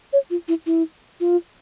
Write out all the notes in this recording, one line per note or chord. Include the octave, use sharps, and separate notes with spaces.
C#5
F4
E4
E4
F4